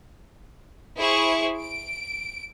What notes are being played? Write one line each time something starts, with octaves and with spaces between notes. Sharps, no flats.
E4 G#4 C5 C#6
D7